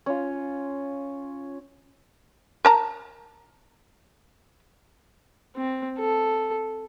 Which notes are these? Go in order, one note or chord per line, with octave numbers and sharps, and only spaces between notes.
C#4 F4
A#4 A5 A#5
C4
A4